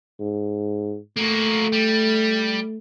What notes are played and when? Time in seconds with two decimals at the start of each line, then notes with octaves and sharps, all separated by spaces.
0.20 G#2
1.17 A3 A#3 F#4
1.73 G3